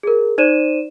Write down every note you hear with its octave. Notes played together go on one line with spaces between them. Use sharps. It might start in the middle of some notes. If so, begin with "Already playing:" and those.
G#4 A#4
D#4 C5 D5 D#7 E7